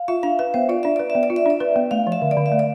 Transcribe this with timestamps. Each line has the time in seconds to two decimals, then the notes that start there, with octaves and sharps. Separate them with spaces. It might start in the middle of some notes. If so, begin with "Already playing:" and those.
Already playing: F5
0.08 F4 E5
0.23 D4 F5
0.39 B4 E5
0.54 B3 C5
0.69 F4 D5
0.83 D4 E5
0.96 B4 D5
1.10 E5
1.15 B3
1.23 D5
1.30 F4
1.36 E5
1.46 D4 D5
1.60 B4
1.76 B3
1.91 A3 F5
2.07 F3
2.12 E5
2.22 D3
2.31 D5
2.37 D3
2.46 E5
2.52 A3
2.59 D5